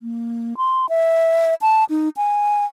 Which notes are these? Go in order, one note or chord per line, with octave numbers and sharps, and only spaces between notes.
A#3
C6
E5
A5
D#4
G#5